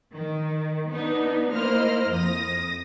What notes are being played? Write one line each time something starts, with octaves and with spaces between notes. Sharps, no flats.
D#3
B3 D4 D#4
A#3 E4 C5 D#5 F6
F2 D#6 A#6